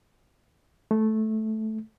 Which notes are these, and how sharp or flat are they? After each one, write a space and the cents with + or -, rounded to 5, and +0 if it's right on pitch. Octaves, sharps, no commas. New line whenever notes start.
A3 -10